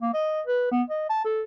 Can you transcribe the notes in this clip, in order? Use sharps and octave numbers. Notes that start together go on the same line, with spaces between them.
A#3
D#5
B4
B3
D#5
A5
A4